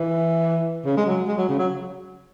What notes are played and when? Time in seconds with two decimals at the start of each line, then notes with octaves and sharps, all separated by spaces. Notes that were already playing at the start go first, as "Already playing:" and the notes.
Already playing: E3
0.85 C#3
0.97 G#3
1.06 F#3
1.28 G#3
1.38 F#3
1.49 C#3
1.59 F#3